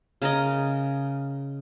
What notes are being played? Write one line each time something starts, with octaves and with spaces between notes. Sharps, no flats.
C#3 A#4 D#5